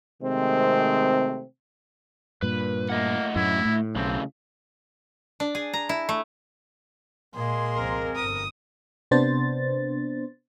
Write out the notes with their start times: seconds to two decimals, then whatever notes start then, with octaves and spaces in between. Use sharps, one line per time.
0.21 C3 D#3 G#3 A3 C4
2.42 G2 A#2 B4
2.90 A3 A#3 D#5 F#5
3.36 F#2 A2 E4
3.65 A2
3.96 B1 C#3 E3 A3 C4
5.40 D4
5.55 G#4
5.74 A#5
5.89 E4
6.09 A3
7.35 A#2 G#3 A#3 G#4 C6
7.75 C2 F2 C4 A#4
8.16 G1 D#6
9.11 C3 B3 D4 C5 A6